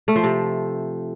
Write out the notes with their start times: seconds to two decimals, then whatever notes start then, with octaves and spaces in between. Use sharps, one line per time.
0.08 A3
0.16 F3
0.23 C3